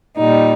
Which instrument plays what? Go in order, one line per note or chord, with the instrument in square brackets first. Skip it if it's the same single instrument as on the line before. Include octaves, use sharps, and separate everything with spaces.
[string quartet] A#2 G3 D#4